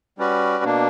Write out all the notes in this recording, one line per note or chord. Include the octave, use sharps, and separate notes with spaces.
G3 C#4 F#4 B4 D5
B2 A#3 D4